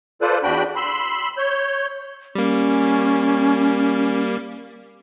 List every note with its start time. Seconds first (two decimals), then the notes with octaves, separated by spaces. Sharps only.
0.21 F4 A4 B4 C5 D5
0.43 E2 D4 F#4 G5 B5
0.76 B5 C6 E6
1.38 C#5 G6
2.35 G3 A#3 C#4